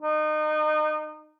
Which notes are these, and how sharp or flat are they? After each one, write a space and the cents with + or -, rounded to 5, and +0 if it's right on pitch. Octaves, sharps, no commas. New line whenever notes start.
D#4 -30